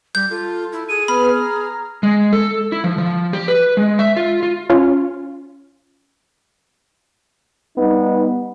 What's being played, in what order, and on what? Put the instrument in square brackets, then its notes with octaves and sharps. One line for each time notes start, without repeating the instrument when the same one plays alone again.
[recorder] G3 [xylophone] G6
[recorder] F4 [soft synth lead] A4
[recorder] E4
[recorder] G#4 [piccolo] D#7
[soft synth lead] B3 [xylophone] B5 [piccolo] F6
[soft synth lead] A#5
[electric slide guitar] G#3
A4
E4
F3
F3
G4
B4
G#3
E5
F4
F4
[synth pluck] C#4 F4
[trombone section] G3 B3 D#4